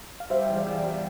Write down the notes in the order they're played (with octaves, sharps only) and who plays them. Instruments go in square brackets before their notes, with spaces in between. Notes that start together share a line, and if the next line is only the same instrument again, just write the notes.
[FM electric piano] F5
[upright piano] G3 [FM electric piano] C5 E5
[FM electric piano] E5 G5
[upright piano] E2
[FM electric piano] D5 F5
[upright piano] E2
G3